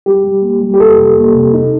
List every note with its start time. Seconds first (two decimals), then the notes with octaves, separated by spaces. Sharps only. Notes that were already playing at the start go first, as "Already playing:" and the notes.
0.06 G3 G4
0.25 G3
0.42 A#3
0.61 G3
0.74 G4
0.80 F2 A4
0.99 C3
1.17 A#3
1.35 C3
1.54 D#4